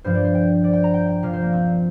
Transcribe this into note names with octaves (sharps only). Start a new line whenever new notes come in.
G2 F3 C5
D5
C5
G5
D5
G5
A#5
G5
G5
A#2 F3 F5
C5
A#3
C4